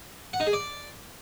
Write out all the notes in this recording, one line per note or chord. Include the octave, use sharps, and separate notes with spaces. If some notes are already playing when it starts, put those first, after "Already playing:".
F#5
D#4
G#4
D5